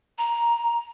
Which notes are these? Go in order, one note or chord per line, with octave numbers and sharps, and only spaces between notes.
A#5